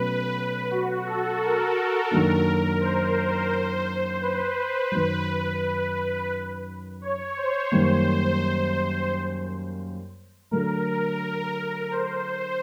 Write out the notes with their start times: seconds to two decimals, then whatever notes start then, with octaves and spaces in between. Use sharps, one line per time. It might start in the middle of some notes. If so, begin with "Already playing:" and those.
Already playing: B2 F#3 A3 C#4 B4
0.71 F#4
1.07 A4
1.41 A#4
2.11 F#2 D#3 F#3 A#3 D4
2.81 C5
4.22 B4
4.92 F#2 D#3 F#3
7.02 C#5
7.37 C5
7.72 F#2 D#3 G3 A#3
10.51 D3 F#3 A3 A#4
11.91 C5